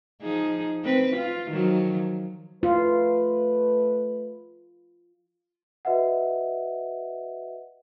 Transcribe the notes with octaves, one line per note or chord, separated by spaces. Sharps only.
F3 D#4 G#4
C4 B4
F4
D#3 F3 F#3
A3 F4 B4
F#4 B4 D#5 E5 F#5